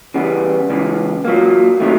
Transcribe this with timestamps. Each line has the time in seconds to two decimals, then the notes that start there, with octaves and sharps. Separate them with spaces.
0.14 C#3 E3 G3 B3
0.70 C#2 C#3 E3
1.25 A#2 F#3 A#3
1.80 C3 D#3 F#3 A3